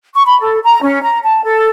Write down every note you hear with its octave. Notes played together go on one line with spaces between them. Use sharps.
C#6
B5
A4
A#5
C#4
A#5
A5
A4